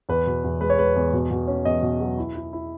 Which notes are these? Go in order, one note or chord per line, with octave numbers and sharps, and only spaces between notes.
E2 B4
B2
E2
G#3 B4
C#5
G#3 B4
E2
B2
B2
C#4
E2 D#5
B2
F#3
E4
E4
E4